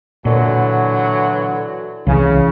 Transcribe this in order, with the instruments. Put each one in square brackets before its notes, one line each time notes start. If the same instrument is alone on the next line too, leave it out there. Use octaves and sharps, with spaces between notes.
[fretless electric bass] A#2 [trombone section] D3 E3 F#3
[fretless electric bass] C2 E3 [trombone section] C#3